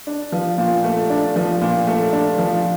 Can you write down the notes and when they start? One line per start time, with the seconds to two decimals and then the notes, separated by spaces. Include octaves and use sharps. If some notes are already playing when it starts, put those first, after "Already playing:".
0.07 D4
0.32 F3
0.58 A#2
0.84 A3
1.10 D4
1.36 F3
1.61 A#2
1.87 A3
2.12 D4
2.38 F3